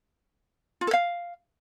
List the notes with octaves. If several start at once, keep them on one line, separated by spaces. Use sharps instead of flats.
F4
A4
F5